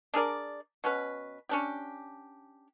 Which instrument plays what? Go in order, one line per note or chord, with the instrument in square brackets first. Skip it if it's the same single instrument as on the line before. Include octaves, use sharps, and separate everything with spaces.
[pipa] D4 G#4 A#4 D5
B2 C#4 B4
C#4 D4 G4